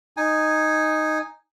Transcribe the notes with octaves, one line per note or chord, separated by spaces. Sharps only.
D#4 G#5